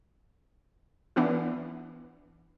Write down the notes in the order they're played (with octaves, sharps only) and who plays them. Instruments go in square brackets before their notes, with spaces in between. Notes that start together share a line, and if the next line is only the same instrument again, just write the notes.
[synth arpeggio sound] E3 B3 D4 E4